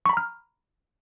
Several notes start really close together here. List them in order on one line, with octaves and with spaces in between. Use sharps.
C#6 B5 A#5 F6